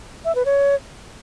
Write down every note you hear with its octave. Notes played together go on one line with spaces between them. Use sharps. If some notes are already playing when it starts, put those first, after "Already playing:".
E5
B4
C#5